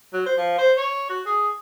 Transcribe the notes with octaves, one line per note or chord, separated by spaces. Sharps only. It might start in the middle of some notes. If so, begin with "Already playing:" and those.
F#3
C5
F3
C5
C#5
F#4
G#4